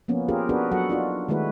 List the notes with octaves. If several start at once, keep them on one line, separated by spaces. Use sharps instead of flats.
F3 A#3 B3 C#4
C#4 F4 G4 G#4 A#4
B3 D4 F#4 G#4 A#4 B4
F#3 F#4 A4 F#5
D4 D#4 F4 F#4
D#3 G#3 A3 E4 F#4 B4